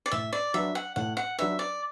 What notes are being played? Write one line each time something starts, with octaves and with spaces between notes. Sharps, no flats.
D5
A2 E5
D5
F#3 D4 B4 E5
F#5
A2 F#5
F#5
F#3 D4 B4 E5
D5